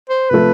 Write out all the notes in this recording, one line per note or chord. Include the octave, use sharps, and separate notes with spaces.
C5
C3 F3 A3 B4